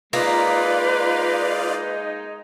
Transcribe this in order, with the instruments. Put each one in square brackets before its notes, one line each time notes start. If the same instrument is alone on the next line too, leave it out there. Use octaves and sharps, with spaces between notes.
[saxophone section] G#3 D#4 [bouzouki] A#3 [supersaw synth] F4 D5 F5 [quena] B4